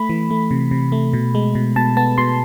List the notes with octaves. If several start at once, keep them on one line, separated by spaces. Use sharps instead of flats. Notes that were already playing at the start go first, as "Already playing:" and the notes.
Already playing: A3 B5
E3
A3
C3
C3
A3
B2
G#3
B2
B2 A5
B3 A5
B2 C6